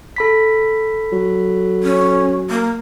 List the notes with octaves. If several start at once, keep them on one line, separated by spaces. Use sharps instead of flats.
A4 B5 B6
F#3
C#4
A#3